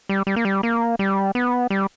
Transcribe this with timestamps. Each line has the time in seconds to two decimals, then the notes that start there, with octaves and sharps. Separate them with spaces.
0.09 G3
0.27 G3
0.36 A#3
0.45 G3
0.63 A#3
0.99 G3
1.35 B3
1.70 G3